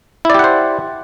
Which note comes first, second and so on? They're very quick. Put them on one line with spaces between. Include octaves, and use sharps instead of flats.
E4 D5 G4 F#5 C5